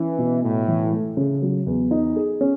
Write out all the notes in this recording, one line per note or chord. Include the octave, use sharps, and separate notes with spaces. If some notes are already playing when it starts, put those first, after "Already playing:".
Already playing: E3 C#4
B2
A2 B3
E3
A3
C#3
F#3
E2
D#4
G#4
C#4